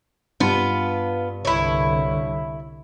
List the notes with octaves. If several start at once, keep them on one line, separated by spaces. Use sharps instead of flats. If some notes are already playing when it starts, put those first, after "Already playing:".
G2 B3 F4
C2 D3 E4 C#5